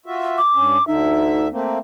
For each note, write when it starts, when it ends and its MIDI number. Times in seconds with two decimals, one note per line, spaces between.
0.06 0.39 65
0.06 0.39 66
0.06 0.39 76
0.38 0.86 86
0.54 0.77 43
0.54 0.77 61
0.87 1.48 38
0.87 1.48 50
0.87 1.47 63
0.87 1.48 76
1.51 1.79 57
1.51 1.79 58
1.51 1.79 60